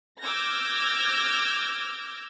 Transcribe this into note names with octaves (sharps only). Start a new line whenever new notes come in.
D6 E6 F6 G6 G#6 A#6